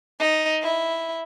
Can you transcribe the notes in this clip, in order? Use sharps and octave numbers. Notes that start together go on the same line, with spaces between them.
D#4
E4